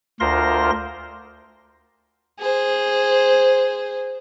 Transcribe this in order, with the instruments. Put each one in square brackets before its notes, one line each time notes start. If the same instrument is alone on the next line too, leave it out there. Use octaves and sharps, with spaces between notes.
[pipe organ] D2 F4 A#4 C5 C6 A#6
[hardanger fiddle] G#4 C5